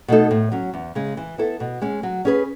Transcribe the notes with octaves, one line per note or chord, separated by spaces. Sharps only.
B2 A3 D#4 A4
A2
F#3 C#4
E2
C#3 G#3
E3
B3 E4 A4
B2
G#3 C#4 G#4
F#3
C#4 G#4 B4